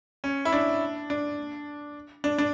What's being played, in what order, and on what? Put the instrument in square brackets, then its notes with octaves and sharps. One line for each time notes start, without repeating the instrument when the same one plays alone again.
[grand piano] C#4
E4
D4
D4
D4
D4